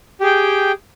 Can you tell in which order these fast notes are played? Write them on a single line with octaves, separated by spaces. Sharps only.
G4 G#4 G5